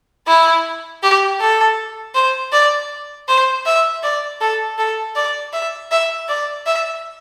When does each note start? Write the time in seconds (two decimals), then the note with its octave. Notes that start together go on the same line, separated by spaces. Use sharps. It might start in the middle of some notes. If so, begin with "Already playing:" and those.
0.27 E4
1.03 G4
1.40 A4
2.15 C5
2.53 D5
3.28 C5
3.66 E5
4.03 D5
4.41 A4
4.78 A4
5.15 D5
5.53 E5
5.91 E5
6.28 D5
6.66 E5